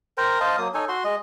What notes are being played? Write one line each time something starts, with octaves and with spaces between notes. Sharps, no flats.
A#4 C5 G5 A#5
C5 D#5 F5 A5
F#3 A#3 D#6
D#4 A4 C#5 G#5
F#4 C6
G#3 D#5